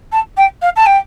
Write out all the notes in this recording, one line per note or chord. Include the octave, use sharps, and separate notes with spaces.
A5
G5
F5
A5
G5